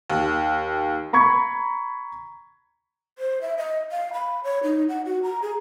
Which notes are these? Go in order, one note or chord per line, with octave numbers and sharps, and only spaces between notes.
D#2
A#5 B5 C#6 G#6
C5
E5
D#5
F5
B5
C#5
D#4
F#5
F#4
A#5
G#4